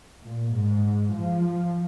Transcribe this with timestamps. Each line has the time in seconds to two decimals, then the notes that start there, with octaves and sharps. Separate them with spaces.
0.25 A#2
0.56 G#2
1.16 F3